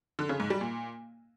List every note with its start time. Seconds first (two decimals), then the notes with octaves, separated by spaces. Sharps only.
0.19 D3
0.29 C#3
0.40 G#2
0.50 G3
0.61 A#2